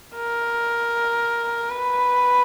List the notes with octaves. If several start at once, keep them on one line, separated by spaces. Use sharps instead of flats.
A#4
B4